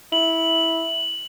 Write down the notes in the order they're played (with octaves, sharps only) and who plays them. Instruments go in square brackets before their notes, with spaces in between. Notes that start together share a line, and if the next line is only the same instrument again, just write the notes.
[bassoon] E4 [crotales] F#7